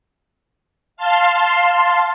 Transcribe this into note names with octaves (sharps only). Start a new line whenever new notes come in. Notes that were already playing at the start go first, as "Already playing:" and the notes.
F5 A5 C6